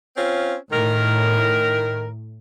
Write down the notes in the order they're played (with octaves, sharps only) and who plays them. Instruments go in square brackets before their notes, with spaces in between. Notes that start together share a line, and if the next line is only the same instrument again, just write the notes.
[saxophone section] C4 C#4 F4
[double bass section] A2 [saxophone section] D#3 A#4